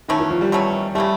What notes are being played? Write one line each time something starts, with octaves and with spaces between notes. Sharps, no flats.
B2 D#3 F#3 A3 C#4
E3
F3
G3
B2 F#3 A3 C#4
C#3 E3 G3 A3